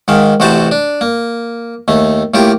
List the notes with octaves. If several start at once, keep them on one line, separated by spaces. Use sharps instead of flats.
G#2 D#3 F5
A1 C3 F#4 C5 A5
D4
A#3
D#2 A3
A2 A#3 F4 G4